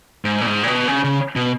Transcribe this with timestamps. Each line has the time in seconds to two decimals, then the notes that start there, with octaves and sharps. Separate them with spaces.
0.25 G#2
0.41 A#2
0.46 G#2
0.63 A#2
0.67 B2
0.88 C#3
1.04 C#3
1.36 B2